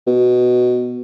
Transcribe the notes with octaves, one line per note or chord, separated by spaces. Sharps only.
B2